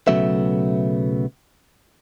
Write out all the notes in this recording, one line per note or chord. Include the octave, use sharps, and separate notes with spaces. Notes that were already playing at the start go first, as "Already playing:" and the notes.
B1 C#3 F#3 A3 B3 E5